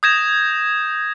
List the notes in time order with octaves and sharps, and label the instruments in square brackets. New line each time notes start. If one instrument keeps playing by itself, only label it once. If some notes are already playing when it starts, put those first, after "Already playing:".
[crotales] D#6 G6 G#6 A#6 E7